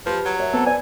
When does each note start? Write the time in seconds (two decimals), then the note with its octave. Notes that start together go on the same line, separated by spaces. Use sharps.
0.06 F3 G4 B4
0.25 F#3
0.38 A#4 C#5 E5
0.53 B3 C4 A4
0.66 B4 D5 G#5